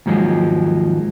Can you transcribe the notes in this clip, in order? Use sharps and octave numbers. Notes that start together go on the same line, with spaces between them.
D#2 G#2 F3 F#3 G#3